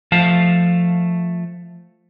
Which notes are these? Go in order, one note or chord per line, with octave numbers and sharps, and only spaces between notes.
F3 A3 F5 A5